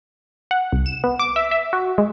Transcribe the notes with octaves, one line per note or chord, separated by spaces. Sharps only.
F#5
C2
E7
B3
D6
E5
E5
F#4
G#3